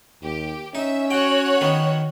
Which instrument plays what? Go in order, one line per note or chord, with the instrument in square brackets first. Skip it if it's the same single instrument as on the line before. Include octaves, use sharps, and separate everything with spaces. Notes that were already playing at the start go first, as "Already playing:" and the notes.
[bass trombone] D#2 [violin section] G4
[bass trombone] C#4 [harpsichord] D#4 [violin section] E5
[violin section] F#4 C#5 F#6 [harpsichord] G5
[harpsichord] D#3 B3